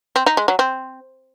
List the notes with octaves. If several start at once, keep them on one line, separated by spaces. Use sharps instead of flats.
C4
D#4
G#3
F#3
C4